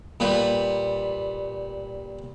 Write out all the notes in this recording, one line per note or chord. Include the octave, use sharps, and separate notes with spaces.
A#2 G3 B4